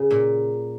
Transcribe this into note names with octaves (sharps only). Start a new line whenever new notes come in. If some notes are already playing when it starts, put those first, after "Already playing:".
Already playing: C#3
A#2